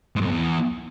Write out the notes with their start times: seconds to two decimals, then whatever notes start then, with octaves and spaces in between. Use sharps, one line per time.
0.16 G#2
0.21 F#2
0.26 F2
0.31 E2